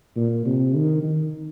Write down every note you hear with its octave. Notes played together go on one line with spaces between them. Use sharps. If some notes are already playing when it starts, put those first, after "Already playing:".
A#2
C3
D#3
D#3